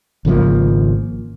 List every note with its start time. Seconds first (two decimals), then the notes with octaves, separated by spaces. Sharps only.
0.25 G#1 C#3 F3 A#3